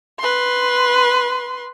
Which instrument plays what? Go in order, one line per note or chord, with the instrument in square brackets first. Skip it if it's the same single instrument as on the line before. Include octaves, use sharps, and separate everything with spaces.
[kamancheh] B4 C6